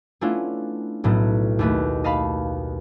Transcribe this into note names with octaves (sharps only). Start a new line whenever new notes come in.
A3 B3 C#4 D4 E4 F4
B1 A2 B3 A4
D#2 A3 B4
D#5 F5 A5 B5